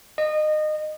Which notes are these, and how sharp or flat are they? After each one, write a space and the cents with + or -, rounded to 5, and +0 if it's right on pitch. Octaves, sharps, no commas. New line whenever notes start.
D#5 -25